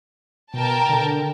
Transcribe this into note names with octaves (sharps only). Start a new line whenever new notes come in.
B2 A#4 G5 A5
D3